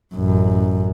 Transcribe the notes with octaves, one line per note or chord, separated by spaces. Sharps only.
A1 F#2